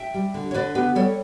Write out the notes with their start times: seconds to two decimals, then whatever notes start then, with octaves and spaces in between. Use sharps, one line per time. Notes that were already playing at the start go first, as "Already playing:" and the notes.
Already playing: E5 G5
0.14 G3
0.34 D3
0.51 C#5
0.54 D3 B4 D5
0.75 B3 G4 B4
0.95 G3 A4 C#5